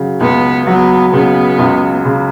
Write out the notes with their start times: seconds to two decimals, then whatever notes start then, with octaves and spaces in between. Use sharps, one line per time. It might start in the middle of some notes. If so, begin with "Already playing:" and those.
Already playing: C#3 F#3
0.21 C#2 B3
0.66 F#3 B3
1.13 C#3 B3
1.59 C#2
2.05 C#3